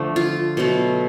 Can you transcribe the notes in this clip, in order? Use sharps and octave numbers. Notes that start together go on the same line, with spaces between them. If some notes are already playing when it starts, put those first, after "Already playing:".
Already playing: D3 F3 A3
F4
B2 F#3 A3